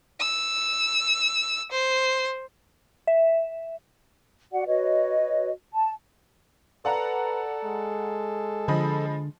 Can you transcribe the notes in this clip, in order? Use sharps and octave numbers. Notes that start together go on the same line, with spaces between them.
E6
C5
E5
F#4 D5 F#5
F#4 B4 C#5 D#5
A5
A4 B4 D5 F#5 A#5
G#3
D3 F3 D#5 B5